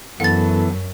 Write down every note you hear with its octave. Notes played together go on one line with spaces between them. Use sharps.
F#2 E3 B3 A4 F#5 A6